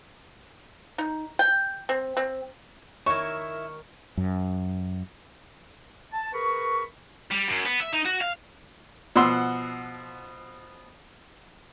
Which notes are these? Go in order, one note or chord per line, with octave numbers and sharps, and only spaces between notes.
D#4
G5
C4
C4
D#3 E4 A#4 C#5 E5 C#6
F#2
A5
G#4 A#4 B4 B5 C#6
G3
F#2
B3
E5
D#4
F#4
F5
B2 F3 F#5 C6 E6